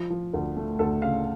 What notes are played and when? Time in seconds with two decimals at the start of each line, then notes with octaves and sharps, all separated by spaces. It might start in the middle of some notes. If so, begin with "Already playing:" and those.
Already playing: F3
0.10 F3
0.34 D2
0.57 A3
0.79 D2 A4
1.02 C#3 F5